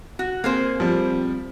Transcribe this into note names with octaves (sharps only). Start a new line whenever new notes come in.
F#4
A#3 C4 G#4 C5
F3 G3